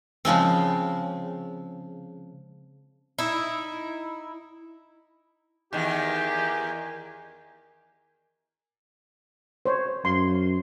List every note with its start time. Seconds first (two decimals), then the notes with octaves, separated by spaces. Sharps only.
0.25 C#3 F3 G#3 C4
3.18 D#4 E4
5.73 E2 D#3 G4 A#4 G#5
9.66 C5 C#5
10.05 F#2 C6